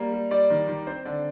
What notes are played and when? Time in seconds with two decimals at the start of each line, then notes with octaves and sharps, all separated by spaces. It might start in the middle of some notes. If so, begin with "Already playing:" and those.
Already playing: G3 A#3
0.12 G3
0.31 G3 D5
0.50 D#3
0.68 D#3
0.87 C4 C5
1.05 D3 D5